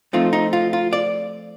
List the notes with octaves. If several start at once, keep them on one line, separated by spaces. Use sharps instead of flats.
F3 A3 C4 D#4 F4
D#4
F4
F4
D5